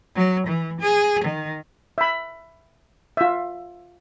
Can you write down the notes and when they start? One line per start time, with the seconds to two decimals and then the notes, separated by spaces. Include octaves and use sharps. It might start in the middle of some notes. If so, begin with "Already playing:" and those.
0.16 F#3
0.47 E3
0.81 G#4
1.24 D#3
1.98 E5 B5
3.17 F4 E5